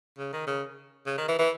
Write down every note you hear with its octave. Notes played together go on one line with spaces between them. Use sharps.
C#3
D#3
C#3
C#3
D#3
E3
E3